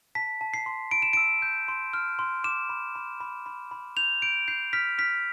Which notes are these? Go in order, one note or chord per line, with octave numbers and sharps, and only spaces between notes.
A5 B6
A5
C7
C6
B5 D7
E7
E6 D7
G6
C6
F6
C6
D6 E7
B5
B5
B5
B5
B5
G6 F7
G6 D7
G6 C7
F6 B6
F6 B6